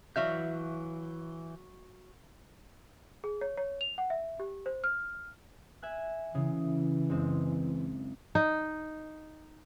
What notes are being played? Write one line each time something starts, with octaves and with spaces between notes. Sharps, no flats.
E3 F#3 E5 F5 G6
G#4
C#5
C#5
F7
F#5
E5
G4
C5
F6
E5 G#5 F#6
C#3 E3
F#1 G#3 C4
D#4